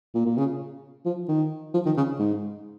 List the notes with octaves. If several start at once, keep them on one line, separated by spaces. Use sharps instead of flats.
A#2
A#2
C#3
F3
D#3
F3
D#3
C#3
G#2